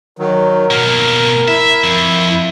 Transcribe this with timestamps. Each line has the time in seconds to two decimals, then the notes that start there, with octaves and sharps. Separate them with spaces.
0.19 D#3 F#3 A#4
0.71 B2 A#3 F6
1.48 E4 E5
1.84 F2